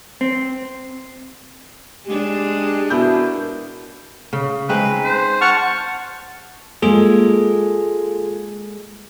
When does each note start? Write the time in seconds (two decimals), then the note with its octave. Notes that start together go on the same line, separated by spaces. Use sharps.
0.21 C4
2.06 G#3 D4 G4
2.90 B2 E4 A#4 G6
4.33 C#3
4.69 G#3 C4 D#4 B4
5.05 C5
5.41 F#5 A5 C#6 F6
6.82 G#3 A#3 F4 G#4 A4